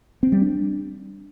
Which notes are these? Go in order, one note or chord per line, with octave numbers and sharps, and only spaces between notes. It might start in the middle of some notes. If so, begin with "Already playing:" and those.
C4
G3
D4